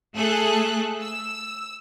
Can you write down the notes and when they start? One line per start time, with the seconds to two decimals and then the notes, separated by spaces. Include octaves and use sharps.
0.15 A3 G#4 A4 F#6
1.00 E6